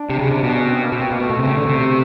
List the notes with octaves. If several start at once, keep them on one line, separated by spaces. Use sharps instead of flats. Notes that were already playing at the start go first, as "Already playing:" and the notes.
Already playing: D4
C3
C#3
C3
B2
C#4
C4
B3
A#3
B2 C4
B2 A#3
A3
B2
C3
C#3
D3
C3